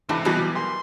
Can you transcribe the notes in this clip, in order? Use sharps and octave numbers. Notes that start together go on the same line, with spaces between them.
G#2 C3 E3 A3 D4 A5 B5
B2 E3 F#3 G3 E4 F#4 G#4
A#4 G#5 C6